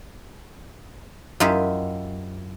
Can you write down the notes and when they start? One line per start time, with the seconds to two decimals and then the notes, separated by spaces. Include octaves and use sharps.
1.40 F#2 E4 F4 G4 D#5 E5